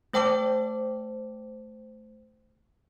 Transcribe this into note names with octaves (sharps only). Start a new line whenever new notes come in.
A3 C5 G5 A5 D6